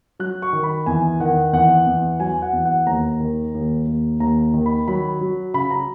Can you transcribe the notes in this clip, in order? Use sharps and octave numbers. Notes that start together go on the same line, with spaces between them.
F#3 F#6
C#6
D#3
B5
E2 G#5
D#3 F#5
E2 F#5
E2
F#3 G#5
F#5
E2
F#5
D#2 A#5
D#3
D#2
D#2
D#2 A#5
D#3
B5
F#3 B5
F#3
C#3 B5
A#5